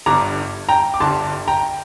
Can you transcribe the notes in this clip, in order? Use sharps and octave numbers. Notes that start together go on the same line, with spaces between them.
G1 G2 D3 A#5 D6
G5 A#5
D6
G1 G2 D3 A5 C6
G5 A#5